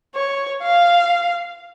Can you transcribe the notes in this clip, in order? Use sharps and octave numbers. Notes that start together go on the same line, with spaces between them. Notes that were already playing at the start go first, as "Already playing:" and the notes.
C#5
F5